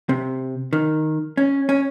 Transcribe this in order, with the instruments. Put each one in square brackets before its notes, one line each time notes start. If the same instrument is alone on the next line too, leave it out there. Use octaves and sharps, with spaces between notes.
[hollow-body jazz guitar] C3
D#3
C#4
C#4